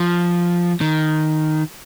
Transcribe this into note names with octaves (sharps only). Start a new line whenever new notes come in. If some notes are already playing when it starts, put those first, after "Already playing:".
Already playing: F3
D#3